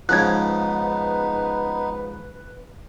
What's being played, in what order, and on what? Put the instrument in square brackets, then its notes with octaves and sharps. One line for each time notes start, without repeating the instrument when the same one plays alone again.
[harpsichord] G#2 C#3 F3 [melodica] B3 D#4 [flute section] B4 [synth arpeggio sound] F#6 G#6